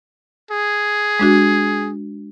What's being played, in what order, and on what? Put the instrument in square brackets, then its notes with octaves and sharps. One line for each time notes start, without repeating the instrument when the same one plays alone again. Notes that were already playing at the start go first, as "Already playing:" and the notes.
[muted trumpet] G#4
[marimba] G#3 D4 F#4